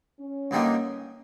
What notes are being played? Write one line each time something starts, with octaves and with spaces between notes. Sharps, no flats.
C#4
G2 D3 G3 A#3 D#4